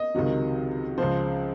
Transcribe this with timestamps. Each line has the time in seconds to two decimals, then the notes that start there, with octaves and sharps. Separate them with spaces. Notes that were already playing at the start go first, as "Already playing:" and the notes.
Already playing: D#5
0.15 C#2 C3 D#3 F#3
0.98 C#2 C#3 F3 C5